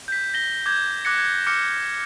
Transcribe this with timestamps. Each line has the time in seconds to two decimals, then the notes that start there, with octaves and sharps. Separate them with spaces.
0.08 G6 B6
0.34 A#6 G7
0.66 D6 G6 G#6
1.05 D6 F#6 G#6 A#6 C#7
1.19 G#6
1.47 D6 F6 C#7